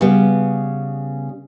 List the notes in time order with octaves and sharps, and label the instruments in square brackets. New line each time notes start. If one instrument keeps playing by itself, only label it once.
[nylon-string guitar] C#3 G3 B3